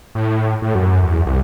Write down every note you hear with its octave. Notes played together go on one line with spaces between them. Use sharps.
A2
A2
F#2
E2
C2